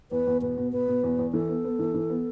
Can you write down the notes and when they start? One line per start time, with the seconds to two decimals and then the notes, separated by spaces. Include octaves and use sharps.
0.11 E2 B4
0.27 E2
0.42 B2 B4
0.57 B2
0.72 B2 B4
0.88 B2
1.03 E2
1.19 E2
1.33 E3 A4
1.49 B3
1.64 B3
1.79 E3
1.94 E3
2.10 B3